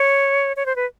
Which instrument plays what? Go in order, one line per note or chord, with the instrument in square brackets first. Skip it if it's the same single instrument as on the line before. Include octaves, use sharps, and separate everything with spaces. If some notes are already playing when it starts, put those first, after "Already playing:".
Already playing: [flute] C#5
C#5
C5
B4